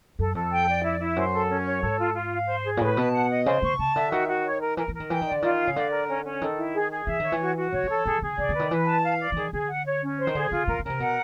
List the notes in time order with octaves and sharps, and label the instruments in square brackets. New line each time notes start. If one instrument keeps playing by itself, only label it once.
[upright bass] F#2 [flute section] A4
[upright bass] F2 [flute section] A4
[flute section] G5
D5
E4
E4
[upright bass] F#2 [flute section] C5
[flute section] A4
C#4
C#5
[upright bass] G#2 [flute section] A4
[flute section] F4
F4
F5
C5
G#4
[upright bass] A#2
[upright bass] A2 [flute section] B4
[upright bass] B2 [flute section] A5
[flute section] F#5
D#5
[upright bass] C#3 [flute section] C5
[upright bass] D3 [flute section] C#6
[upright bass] C#3 [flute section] A5
[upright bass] D3 [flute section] E5
[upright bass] D#3 [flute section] F#4
[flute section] F#4
C#5
A#4
[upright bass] E3 [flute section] A#4
[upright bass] E3
[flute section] A#4
[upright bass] D#3
[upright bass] E3 [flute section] G5
[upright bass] D#3
[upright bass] D3 [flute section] D5
[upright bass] D#3 [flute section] F4
[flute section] F5
[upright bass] C#3
[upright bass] D3 [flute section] D5
[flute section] A#4
C#4
C#4
[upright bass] D#3 [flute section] A4
[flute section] E4
G#4
G#4
[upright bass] E3 [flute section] E5
[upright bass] D#3 [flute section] C#5
[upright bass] E3
[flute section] F#4
F#4
[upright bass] D#3 [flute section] C#5
[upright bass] E3
[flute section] A4
[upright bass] E3 [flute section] G#4
[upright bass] D3 [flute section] G#4
[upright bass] C#3 [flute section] D5
[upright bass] D3
[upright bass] D#3 [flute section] B4
[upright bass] E3 [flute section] B4
[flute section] A5
F5
D5
[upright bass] E3
[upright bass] D#3 [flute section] G#4
[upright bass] D3 [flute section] G#4
[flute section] F#5
C#5
C#4
C5
[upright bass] D#3
[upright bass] D3 [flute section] G#4
[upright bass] D3 [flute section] F4
[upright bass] D3 [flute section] A#4
[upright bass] D3
[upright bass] C#3 [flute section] A#4
[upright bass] C3
[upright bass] B2 [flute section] F#5